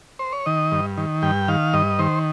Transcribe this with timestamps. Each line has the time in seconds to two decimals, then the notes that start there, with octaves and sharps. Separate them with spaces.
0.19 C5
0.33 C#5
0.46 D#3 D#5
0.72 G2
0.97 D#3
1.22 G2 G5
1.48 D#3 F5
1.74 G2 D#5
1.99 D#3 C5